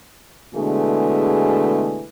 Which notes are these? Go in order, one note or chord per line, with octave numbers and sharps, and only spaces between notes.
B2 D3 E3 G#3 A3 G#4